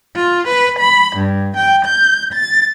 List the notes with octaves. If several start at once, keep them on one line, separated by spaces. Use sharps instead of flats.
F4
B4
B5
G2
G5
G6
A6